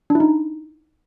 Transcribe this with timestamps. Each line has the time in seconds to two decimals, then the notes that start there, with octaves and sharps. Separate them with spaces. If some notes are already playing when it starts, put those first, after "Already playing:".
0.10 D4
0.15 E4
0.20 D#4